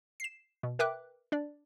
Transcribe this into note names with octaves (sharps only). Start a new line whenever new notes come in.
C7 E7
B2
A#4 B4 E5 G5 D6 F#6
D4 D5